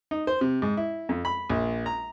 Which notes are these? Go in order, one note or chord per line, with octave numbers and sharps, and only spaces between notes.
D#4
C5
C3
G#2
E4
F2
B5
A#1
A#5